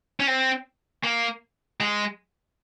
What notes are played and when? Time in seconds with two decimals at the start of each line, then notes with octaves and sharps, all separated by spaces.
0.20 C#4
0.27 C4
1.04 A#3
1.80 G#3